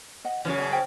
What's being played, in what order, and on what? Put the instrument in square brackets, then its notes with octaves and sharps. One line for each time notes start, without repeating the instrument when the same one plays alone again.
[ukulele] D#5 F#5
[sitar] F#2 C#3 E3 [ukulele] F#4 C#5
[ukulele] D5 G#5 A5
C5 C#5 G5